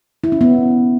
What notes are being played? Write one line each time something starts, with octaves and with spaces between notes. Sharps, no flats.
E4
C#4
B3